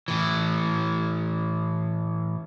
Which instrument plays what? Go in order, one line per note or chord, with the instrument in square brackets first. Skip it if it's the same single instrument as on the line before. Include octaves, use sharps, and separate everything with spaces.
[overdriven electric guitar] A2 E3